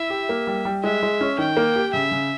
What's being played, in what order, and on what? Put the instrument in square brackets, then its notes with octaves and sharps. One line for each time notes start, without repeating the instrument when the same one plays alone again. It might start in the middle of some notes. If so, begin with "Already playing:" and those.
Already playing: [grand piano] E4 [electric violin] E5
[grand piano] G4
A#3
G3
G3
[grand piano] G#3 [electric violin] E5
[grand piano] G#3
C#4
[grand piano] D#3 [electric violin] G5
[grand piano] A#3
G4
[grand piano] C#3 [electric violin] E5
[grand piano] C#3